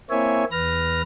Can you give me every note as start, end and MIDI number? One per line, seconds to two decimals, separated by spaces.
0.10 0.44 58
0.10 0.44 60
0.10 0.44 64
0.10 0.44 73
0.10 0.44 76
0.10 0.44 80
0.52 1.02 40
0.52 1.02 71
0.52 1.02 89
0.52 1.02 94